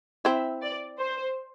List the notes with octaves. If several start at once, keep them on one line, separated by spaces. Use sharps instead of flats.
C4 E4 E5
D5
C5